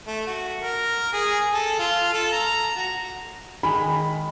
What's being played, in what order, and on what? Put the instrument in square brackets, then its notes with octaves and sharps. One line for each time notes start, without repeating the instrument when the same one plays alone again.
[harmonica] A3
F#4
A#4
G#4
A4
F4
A4
A#5
F#4
[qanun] D#3 G#3 [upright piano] B5